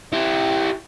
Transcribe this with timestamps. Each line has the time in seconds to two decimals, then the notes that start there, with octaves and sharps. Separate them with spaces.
0.12 E4 G4